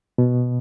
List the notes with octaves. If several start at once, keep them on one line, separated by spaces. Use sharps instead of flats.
B2